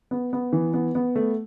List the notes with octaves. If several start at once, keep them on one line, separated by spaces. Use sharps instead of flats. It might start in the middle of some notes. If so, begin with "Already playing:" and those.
B3
B3
E3
B3
B3
A3